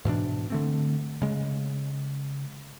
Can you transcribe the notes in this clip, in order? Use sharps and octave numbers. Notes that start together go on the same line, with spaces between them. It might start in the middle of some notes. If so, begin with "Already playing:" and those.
G#2 B2 E3 D4
D3 A3 C4
C#3 G#3